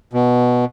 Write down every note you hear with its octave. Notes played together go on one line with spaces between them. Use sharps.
B2